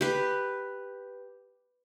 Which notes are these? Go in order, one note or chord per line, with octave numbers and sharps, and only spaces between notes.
G4 B4